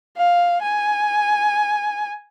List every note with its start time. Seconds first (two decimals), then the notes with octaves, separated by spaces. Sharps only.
0.17 F5
0.62 G#5